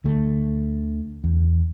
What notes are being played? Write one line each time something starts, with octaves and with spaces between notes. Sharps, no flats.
D2 D3 A3
E2